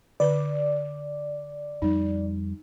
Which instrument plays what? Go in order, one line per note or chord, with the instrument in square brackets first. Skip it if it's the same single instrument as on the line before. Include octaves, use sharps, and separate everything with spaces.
[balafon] D3 B4 [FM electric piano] D5
[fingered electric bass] F2 G3 [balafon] D#4